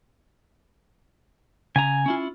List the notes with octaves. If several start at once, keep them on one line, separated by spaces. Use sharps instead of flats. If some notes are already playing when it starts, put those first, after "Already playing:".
C#3 G#5 A#5
C#4 E4 F4